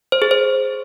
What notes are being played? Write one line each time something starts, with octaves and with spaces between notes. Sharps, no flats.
C5
G#4
C5